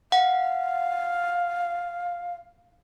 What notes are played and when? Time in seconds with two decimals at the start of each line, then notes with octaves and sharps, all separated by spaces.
0.12 F5 F#5